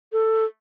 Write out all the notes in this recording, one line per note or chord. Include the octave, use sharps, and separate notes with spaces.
A4